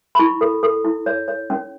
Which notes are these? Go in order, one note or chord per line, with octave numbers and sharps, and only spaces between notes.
B5
E4 C#6
A4
A4
E4
C#5
C#5
C#4